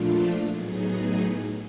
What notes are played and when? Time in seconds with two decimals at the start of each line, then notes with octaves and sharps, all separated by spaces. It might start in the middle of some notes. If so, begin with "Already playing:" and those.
Already playing: A#2 F3 A3 D4 F4
0.50 A2 F#3 B3 D#4 G#4